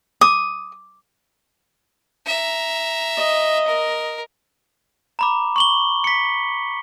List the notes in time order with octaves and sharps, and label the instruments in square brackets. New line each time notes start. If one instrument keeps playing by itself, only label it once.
[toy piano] D6 [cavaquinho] D#6
[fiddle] E5 A#5
[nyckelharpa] D#5
[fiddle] A#4
[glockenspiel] A#5 B5 D6
C#6 F#7 G7
B6 C#7